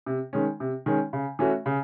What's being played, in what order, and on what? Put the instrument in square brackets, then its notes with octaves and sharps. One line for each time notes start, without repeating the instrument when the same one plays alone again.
[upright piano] C3
D#3 G#3 C#4
C3
D#3 G#3 C#4
C#3
E3 A3 C#4 F#4
C#3